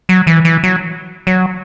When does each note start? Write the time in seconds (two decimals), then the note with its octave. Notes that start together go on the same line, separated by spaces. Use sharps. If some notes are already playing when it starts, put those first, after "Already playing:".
0.09 F#3
0.27 E3
0.45 E3
0.63 F#3
1.27 F#3